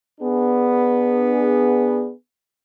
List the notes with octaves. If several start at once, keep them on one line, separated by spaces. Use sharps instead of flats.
B3 D4 G#4